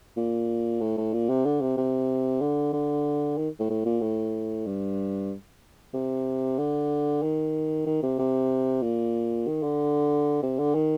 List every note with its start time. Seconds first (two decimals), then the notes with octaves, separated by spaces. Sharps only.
0.17 A#2
0.81 A2
0.97 A2
1.13 A#2
1.29 C3
1.45 D3
1.61 C3
1.77 C3
2.41 D3
2.73 D3
3.38 D#3
3.59 A2
3.70 A2
3.85 A#2
4.01 A2
4.66 G2
5.94 C3
6.58 D3
7.22 D#3
7.86 D#3
8.03 C3
8.18 C3
8.82 A#2
9.47 D#3
9.63 D3
10.43 C3
10.59 D3
10.75 D#3